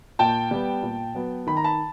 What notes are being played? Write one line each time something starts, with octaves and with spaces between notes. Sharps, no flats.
A#2 G5 A5
G3 B3
A#2
F#3 B3
D#3 B5
A#5
A5 B5